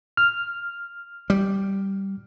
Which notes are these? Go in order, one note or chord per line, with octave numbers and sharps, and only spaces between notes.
F6
G3